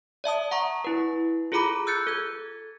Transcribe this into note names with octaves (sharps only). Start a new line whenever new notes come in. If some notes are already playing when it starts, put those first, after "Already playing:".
D5 E5 A5 D#6
F#5 A#5 C#6
E4 B4
F4 G#4 A4 A#5 B5 D6
E6 F#6 G6 A6 C#7
A4 G#6